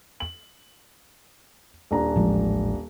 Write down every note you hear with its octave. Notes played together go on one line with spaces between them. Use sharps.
F#7
D#1 D4 A#5
A1 F3 G#3